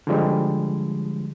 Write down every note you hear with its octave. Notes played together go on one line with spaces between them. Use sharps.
D3 F3 G3 G#3